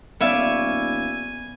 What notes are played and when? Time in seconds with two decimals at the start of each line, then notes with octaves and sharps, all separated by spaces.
0.20 D#1 B3 C#5 D5 E5 F5 G#5